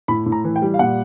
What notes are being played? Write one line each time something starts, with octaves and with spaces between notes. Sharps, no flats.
A2 B5
A2
A#5
E3
G5
G3
F5
A#2 F#5